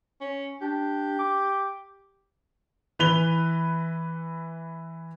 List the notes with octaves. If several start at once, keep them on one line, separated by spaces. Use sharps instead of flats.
C#4
D4 G4
D6
E3 B4 F7 G7